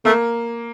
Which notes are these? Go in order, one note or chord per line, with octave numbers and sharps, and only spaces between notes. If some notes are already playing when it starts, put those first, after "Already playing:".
A3 A#3